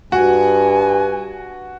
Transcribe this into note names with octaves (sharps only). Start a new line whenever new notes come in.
G2 F#4 G#5